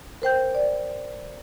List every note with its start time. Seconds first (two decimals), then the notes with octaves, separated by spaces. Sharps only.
0.22 A#4 C5 G5 G6
0.55 D5